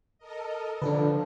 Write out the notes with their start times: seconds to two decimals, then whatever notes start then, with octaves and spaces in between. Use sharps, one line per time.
0.18 A4 A#4 D#5
0.82 D3 F3 D4 A4 B4